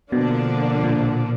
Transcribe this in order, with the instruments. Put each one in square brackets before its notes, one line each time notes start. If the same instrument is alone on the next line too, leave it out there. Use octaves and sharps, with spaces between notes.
[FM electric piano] B2 [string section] D3 F3 A#3 D4
[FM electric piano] A#2